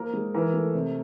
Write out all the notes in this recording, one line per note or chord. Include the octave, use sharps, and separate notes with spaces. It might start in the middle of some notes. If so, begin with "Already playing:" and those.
Already playing: F3 A#3 A#4
G#3
E3 A#4
A3
C3